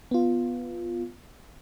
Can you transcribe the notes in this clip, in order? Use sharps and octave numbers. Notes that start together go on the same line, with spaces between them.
B3 F4